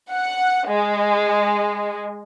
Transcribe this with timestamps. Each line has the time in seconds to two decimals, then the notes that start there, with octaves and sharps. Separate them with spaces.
0.11 F#5
0.68 G#3